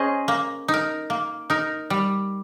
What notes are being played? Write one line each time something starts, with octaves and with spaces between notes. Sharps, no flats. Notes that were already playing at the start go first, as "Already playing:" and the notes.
Already playing: C#4 G#4 C5 D#5
A#3
D#4
A#4
A#3
D#4 A#4
G3